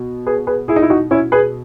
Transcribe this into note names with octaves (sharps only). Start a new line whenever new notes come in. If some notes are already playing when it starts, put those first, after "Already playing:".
Already playing: B2
G#4 B4
G#4 B4
E4 G#4
D#4
E4
D#4 F#4
C#4 E4
G#4 B4